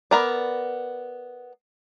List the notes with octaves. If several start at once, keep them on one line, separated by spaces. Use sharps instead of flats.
B3 A#4 D5